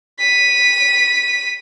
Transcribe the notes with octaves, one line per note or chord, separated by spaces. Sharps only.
B6 D#7